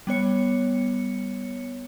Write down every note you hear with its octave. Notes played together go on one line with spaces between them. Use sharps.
G3 B3 C#5 C#7